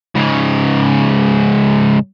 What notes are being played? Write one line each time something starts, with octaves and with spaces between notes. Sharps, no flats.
G#2 C#3